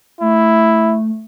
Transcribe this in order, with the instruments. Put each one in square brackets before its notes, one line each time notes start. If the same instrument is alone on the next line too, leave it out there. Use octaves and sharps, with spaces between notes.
[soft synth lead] A3 [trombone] E4